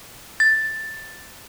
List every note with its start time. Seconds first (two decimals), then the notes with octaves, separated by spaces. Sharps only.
0.40 A6